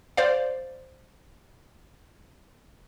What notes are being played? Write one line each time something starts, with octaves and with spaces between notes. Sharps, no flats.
C5 D5 F5